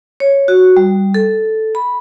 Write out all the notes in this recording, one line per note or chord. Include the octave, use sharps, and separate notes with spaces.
C#5
F#4
G3
A4
B5